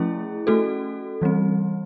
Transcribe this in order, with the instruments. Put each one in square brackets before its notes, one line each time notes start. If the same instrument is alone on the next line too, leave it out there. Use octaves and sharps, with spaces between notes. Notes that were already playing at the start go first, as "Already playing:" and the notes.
Already playing: [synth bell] F3 A3 C#4 E4 G#4
A3 C#4 F#4 A4
E3 G3 C4